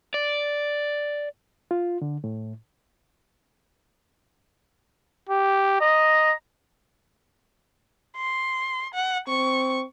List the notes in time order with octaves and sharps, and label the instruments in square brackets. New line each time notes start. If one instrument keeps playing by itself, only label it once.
[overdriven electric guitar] D5
[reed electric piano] F4
D3
A2
[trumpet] G4
[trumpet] D#5 [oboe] A#5
[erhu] C6
F#5
[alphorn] C4 [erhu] C#6